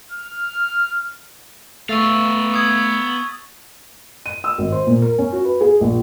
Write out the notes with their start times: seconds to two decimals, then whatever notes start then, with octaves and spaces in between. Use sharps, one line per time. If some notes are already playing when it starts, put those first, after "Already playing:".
0.12 F6
1.89 A3 B3 F5 C#6 E6 A6
2.54 D#6 G#6
4.26 D#7
4.44 E6
4.58 G#1
4.72 C5
4.87 A#2
5.02 A#4
5.18 C#4
5.32 F#4
5.44 B4
5.61 G#4
5.81 A#1